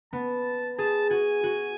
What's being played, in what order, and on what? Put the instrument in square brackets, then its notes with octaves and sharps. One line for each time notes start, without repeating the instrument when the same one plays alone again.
[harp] B3 [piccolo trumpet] A5
[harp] G#4 [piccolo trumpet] A5
[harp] F#4 [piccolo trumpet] G#5
[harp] F#4